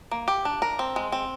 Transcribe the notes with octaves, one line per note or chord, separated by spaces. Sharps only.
A#3
G4
D4
A#4
C4
G#3
C4